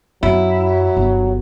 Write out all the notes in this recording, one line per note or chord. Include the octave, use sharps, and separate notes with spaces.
F#2 F#3 E4
G1